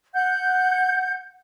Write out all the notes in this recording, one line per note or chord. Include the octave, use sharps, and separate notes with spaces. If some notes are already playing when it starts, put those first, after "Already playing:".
F#5 G6